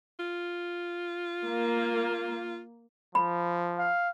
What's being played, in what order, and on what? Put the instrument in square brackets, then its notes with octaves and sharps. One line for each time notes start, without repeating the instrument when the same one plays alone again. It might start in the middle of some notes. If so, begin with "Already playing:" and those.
[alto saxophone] F4
[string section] A#3
[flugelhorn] F3 [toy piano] B5
[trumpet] F5